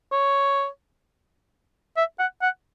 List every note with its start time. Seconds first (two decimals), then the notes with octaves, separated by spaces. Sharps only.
0.12 C#5
1.97 E5
2.19 F#5
2.42 F#5